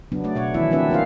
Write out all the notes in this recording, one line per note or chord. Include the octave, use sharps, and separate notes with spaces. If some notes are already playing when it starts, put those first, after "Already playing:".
C#3 F#3 B3 D4
A3 D5
B2 C#5 F#5
D#3 E3 B3 C#4 E4 E5
F3 C4 D4 B4 E5
A#3 F4 C5 F5